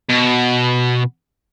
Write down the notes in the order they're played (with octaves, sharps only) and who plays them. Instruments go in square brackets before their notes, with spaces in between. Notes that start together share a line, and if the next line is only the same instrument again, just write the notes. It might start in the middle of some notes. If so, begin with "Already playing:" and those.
[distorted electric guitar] B2